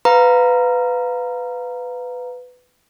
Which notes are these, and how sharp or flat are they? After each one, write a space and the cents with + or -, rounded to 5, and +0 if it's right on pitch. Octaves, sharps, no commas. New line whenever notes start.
B4 +15 F5 +15 A#5 +0